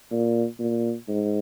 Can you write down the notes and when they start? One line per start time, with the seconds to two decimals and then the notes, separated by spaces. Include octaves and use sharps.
0.11 A#2
0.60 A#2
1.08 G#2